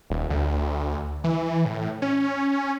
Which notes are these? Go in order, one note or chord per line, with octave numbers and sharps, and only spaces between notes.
D#1
D2
E3
A2
C#4